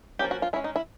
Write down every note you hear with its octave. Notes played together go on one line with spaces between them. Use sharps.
F3 A#3 C#4 G4
F#4
F4
G#3 C#4 E4
D#4
E4